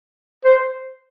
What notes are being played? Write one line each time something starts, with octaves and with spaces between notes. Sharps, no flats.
C5